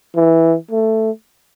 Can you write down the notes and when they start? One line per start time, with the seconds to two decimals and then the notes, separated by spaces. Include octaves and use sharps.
0.16 E3
0.71 A3